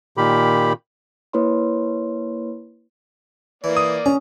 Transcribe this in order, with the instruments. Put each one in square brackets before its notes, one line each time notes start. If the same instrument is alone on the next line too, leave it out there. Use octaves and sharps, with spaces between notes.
[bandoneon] A#2 D#3 G4 B5
[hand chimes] A#3 E4 B4 C#5 B5 C6
[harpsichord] E3 [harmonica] A#3 D5
[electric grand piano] D#6
[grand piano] C#4 [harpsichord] A#5